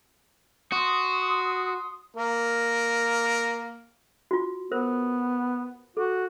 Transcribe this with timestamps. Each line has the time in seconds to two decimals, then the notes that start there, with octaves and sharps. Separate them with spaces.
0.72 F#4 C6 D#6
2.17 A#3 A#4
4.31 F4 F#4
4.72 B3 A#4 C5
5.97 F#4 A4